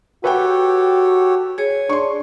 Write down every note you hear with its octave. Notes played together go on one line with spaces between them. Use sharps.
F#4 G4 A4 B4 C#5 F#5 G5
G#4 C#5 G#5
D4 C6 C#6